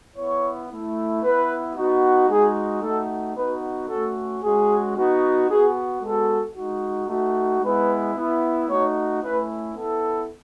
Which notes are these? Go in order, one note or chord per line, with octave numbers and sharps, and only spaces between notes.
B3 E4 C#5
A3 E4
B3 E4 B4
B3 D#4 F#4
G#3 D#4 F#4 G#4
A3 D#4 F#4 A4
B3 D#4 F#4 B4
A3 C#4 F#4 A4
G#3 C#4 F#4 G#4
B3 D#4 F#4
B3 F#4 G#4
G#3 B3 F#4 A4
G#3 D#4 F#4
A3 D#4 F#4
G#3 B3 E4 B4
B3 E4
A3 D#4 F#4 C#5
A3 C#4 E4 B4
B3 E4 A4